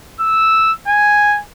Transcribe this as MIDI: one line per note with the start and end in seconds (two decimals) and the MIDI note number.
0.20 0.73 88
0.87 1.39 80